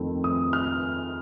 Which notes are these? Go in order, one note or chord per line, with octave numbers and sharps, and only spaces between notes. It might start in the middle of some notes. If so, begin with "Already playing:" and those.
Already playing: F2 D#3 A3 C4
D#6
F6